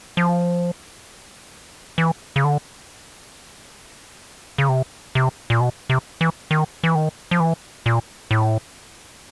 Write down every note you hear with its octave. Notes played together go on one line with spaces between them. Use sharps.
F3
E3
C#3
D3
C#3
C3
C3
A#2
B2
C3
E3
D#3
E3
D#3
F3
E3
A#2
A2